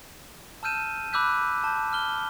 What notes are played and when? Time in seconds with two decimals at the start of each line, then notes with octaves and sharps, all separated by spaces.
0.63 A5 E6 F6 G6 D#7 E7
1.13 B5 D6 E6 F#6 G6 B6
1.64 A5 G6
1.93 F6 G7